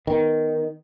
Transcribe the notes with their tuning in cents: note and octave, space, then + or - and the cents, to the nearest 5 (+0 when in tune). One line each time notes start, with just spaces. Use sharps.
D#3 +0 B3 +0